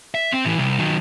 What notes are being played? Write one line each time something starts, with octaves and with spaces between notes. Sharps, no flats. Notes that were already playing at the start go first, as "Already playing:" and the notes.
E5
C4
A2 E3
C2
D#3 F#3